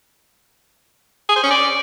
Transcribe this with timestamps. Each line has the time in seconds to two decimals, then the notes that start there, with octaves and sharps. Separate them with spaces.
1.29 G#4
1.36 C5
1.44 C#4
1.51 D5